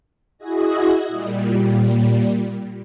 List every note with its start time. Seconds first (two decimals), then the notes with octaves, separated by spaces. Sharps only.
0.38 E4 F#4 G#4 D#5
1.08 A#2 G3